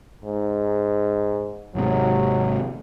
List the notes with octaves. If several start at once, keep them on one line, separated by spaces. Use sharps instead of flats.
G#2
G#1 G#2 C3 F#3